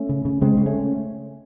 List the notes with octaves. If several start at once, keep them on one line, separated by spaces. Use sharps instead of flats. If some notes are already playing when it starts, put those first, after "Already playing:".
Already playing: A3 C#4
C#3
C#3
C#3 G#3 C4
C#3
A3 C#4